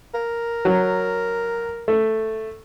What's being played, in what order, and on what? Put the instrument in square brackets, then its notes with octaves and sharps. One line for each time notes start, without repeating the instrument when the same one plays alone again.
[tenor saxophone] A#4
[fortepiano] F#3
A3